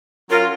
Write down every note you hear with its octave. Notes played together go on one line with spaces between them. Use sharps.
F#3 C#4 F4 A#4